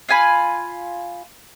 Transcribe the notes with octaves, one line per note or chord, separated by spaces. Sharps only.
F4 F5 G#5 B5